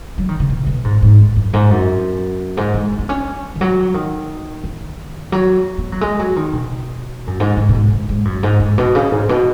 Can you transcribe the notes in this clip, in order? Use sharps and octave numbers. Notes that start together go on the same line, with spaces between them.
F#3
D#3
C#3
B2
B2
G#2
G#2
F#2
G#2
F#2
G#2
G#3
B3
C#4
D#3
F#3
D#3
D#3
F#3
B3
F#3
G#3
F#3
D#3
B2
F#2
G#2
G#2
B2
G#2
G#2
G#2
F#2
G#2
G#2
B2
C#3
G#2
B2